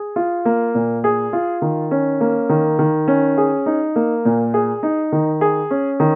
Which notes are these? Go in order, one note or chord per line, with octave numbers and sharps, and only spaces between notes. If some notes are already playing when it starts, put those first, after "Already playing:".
Already playing: G#4
F4
A#3
A#2
G#4
F4
D#3
C#4
A#3
D#3
D#3
C#4
G#4
D#4
A#3
A#2
G#4
D#4
D#3
G#4
C#4
D#3